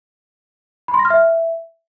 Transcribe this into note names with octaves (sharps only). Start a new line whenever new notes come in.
B5
C6
A#6
F6
E5